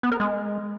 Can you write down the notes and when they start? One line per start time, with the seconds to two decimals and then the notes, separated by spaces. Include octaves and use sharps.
0.03 B3
0.12 A#4
0.20 G#3